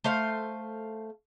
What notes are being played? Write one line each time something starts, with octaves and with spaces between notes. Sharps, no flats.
A3 C5 F5